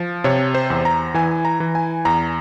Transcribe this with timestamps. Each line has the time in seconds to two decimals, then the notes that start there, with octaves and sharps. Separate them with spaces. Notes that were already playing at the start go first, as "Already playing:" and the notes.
Already playing: F3
0.24 C3 C#5
0.55 C5
0.70 E2
0.85 A#5
1.14 E3 G#5
1.45 A#5
1.60 E3
1.75 G#5
2.05 E2 A#5